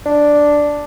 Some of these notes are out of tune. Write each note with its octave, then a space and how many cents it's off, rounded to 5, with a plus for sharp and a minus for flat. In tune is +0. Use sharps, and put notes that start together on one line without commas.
D4 +0